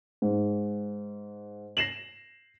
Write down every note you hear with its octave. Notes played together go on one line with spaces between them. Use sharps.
G#2
A#6 C7 E7 F#7